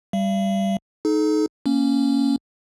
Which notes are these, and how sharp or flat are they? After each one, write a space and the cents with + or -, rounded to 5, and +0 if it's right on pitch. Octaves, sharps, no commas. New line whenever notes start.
G3 +0 F5 -45
D#4 +0 A4 -40
A#3 +0 C#4 +0